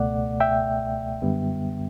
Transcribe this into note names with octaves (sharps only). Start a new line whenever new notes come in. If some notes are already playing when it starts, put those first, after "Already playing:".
Already playing: C#2 B2 A3 D5 F#5
E5 G5
F#2 D3 G3 B3